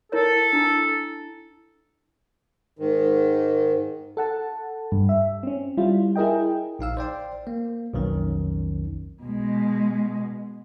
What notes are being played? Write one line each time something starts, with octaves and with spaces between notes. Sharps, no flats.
E4 A4 A#4 C#5
D4 E4
G#2 D#3
A4 F#5 A5
G2
E5
C4 C#4
G3 E4 F4
E4 G#4 A#4 D#5 G5
A#1 D#4 F5 E6
C5 D5 G5 C6
A#3
B1 F2 D#3 C#4
B2 G#3